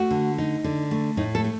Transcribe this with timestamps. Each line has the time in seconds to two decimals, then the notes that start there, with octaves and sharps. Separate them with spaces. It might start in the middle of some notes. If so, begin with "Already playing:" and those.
Already playing: A3 F#4
0.11 D3
0.38 D#4
0.64 D3
0.91 A3
1.17 A2 D#4
1.35 A4
1.44 A3